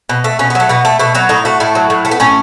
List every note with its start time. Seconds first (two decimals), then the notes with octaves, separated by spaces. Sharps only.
0.09 B2
0.24 A3
0.39 B2 C#4
0.50 B3
0.55 F#3 A3
0.69 B2 B3
0.85 A3
0.99 B2 A3
1.14 F#3 B3
1.29 A2 D#4
1.45 A3 F#4
1.60 A2 E4
1.75 F#3
1.90 A2
2.05 A3
2.11 B3
2.20 A2 C#4